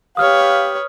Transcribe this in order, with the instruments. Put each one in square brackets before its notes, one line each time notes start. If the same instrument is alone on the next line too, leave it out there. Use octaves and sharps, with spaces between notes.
[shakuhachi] G4 [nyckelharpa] B4 C#5 [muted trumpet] F5 [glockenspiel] D#6 F6